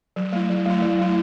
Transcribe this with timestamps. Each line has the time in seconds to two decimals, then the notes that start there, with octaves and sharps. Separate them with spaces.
0.16 F#3
0.33 A3 E4
0.50 F#3
0.66 A3 E4
0.82 F#3
0.99 A3 E4